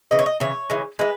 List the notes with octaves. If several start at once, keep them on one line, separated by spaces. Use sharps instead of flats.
C#3 E3 D#5
C#5
D#5
C#3 E3 C#5
C#3 E3 G#3
E3 G#3 B4